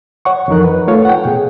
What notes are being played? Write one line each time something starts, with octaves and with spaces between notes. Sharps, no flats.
C#5 F#5 C#6
F2 E3 F3 D#4 A#4 F#6
B4
A3 F4 A4 C#5 F5
F#5 G5
B2 G#4